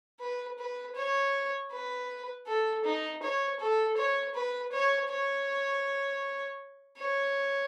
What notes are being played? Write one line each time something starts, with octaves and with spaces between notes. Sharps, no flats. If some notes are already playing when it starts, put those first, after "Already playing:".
B4
B4
C#5
B4
A4
D#4
C#5
A4
C#5
B4
C#5
C#5
C#5